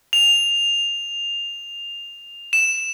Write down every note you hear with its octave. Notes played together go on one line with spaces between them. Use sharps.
F7
E7